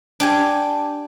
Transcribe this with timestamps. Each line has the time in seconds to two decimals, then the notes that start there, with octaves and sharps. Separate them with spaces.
0.20 D4 G4 G#5